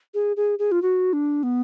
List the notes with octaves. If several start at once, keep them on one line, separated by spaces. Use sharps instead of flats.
G#4
G#4
G#4
F4
F#4
D4
B3